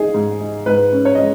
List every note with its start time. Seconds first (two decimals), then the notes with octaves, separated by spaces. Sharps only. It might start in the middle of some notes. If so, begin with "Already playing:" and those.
Already playing: D#4 G#4 G#5
0.14 G#2
0.40 D#4
0.66 G#2 B4
0.92 C#4
1.05 C#5
1.15 G#3 D#5